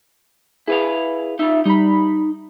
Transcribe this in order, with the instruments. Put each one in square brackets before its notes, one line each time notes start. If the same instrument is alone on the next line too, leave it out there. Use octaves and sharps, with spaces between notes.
[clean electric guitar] E4 B4 F5 [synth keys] G#4
[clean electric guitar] D#4 F4 [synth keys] E5
[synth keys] G3 B5 [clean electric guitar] D#4